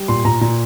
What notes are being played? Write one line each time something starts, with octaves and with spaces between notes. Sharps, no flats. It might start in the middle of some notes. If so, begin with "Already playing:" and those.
Already playing: G3
A#2 C6
A#2 A#5
A#2 A#5